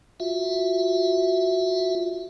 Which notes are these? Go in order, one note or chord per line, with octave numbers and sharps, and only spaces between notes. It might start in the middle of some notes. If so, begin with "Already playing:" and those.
F4 F#4 E5